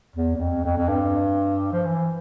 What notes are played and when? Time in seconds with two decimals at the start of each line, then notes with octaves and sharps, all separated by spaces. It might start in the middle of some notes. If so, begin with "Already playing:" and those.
0.16 E2
0.35 E2
0.40 F2
0.64 F2
0.77 F2
0.88 G2
1.72 F3
1.85 E3